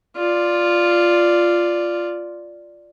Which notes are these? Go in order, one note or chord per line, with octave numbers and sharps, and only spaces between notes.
F4 D5